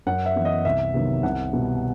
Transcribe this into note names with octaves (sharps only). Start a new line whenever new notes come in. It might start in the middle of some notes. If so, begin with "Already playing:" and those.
F#2 F#5
E5
E3 B3
D#5
C2 E5
C3 D#3 F#3 B3
C2 F#5
B2 G3 B3